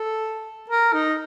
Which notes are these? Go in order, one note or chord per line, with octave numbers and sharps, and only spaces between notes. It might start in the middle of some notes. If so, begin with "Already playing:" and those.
Already playing: A4
A#4
D#4